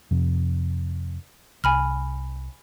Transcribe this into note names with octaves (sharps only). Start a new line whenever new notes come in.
F2 C3
C2 G#5 B5 F6